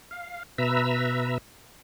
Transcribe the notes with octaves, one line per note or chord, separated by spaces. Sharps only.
F5
B2 B4 E5 A#5 E6